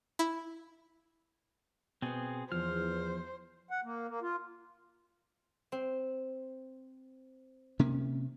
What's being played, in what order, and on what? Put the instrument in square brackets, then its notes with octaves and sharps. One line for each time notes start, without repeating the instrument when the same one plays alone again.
[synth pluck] E4
[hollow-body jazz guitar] B2 B3 [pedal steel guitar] C4 G#4
[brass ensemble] E2 [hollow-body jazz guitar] F3 [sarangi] C5 [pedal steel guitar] F6
[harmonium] F#5
A#3
A#3
F4
[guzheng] C4
[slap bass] C3 A#3 C#4